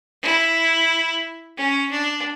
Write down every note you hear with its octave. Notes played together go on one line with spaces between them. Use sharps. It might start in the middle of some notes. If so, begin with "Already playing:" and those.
E4
C#4
D4